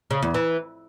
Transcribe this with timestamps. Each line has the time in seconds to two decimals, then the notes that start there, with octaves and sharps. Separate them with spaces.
0.11 C#3
0.22 E2
0.34 E3